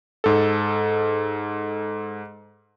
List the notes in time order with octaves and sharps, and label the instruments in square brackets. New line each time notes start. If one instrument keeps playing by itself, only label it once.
[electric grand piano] G#2 A4